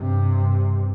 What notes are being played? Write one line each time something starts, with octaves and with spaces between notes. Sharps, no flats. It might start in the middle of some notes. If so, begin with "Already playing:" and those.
Already playing: G2 C3